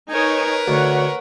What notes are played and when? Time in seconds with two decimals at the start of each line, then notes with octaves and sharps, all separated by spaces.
0.12 D#4 A#4 B4 C#5 G#5
0.68 D2 C#5 F#5